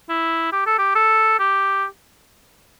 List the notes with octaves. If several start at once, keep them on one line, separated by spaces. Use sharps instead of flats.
E4
G4
A4
G4
A4
G4